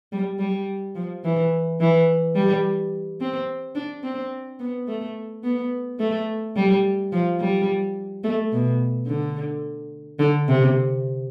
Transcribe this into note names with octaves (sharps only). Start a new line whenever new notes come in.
G3
G3
F3
E3
E3
G3
C4
D4
C4
B3
A3
B3
A3
G3
F3
G3
A3
B2
D3
D3
C3